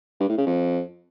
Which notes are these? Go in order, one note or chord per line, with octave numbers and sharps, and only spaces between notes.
G2
A2
C#3
F2